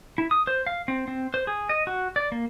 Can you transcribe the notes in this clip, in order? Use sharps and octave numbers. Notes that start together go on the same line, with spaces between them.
E4
D#6
C5
F5
C4
C4
C5
G#4
D#5
F#4
D5
A#3